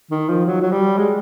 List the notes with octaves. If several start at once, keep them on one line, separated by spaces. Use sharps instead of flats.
D#3
F3
F#3
F#3
G3
G#3